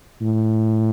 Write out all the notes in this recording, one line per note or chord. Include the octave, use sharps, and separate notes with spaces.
A2